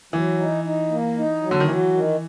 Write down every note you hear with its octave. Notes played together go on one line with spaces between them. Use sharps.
E3 F#3
D#4
D#4
A#3
D#4
F#3
D3
D#3
E3 F#3
D#3